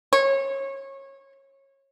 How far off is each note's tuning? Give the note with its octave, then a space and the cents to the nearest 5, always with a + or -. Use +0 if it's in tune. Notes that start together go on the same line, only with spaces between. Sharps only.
C#5 -25